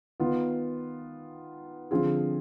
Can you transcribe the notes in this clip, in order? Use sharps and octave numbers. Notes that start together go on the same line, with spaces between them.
D#3 B3 F4
D3 F3 C4 F4 G#4